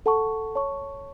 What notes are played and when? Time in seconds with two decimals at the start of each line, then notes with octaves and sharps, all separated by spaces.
0.06 A4 F#5 A5 C#6
0.55 C#5 A5 C#6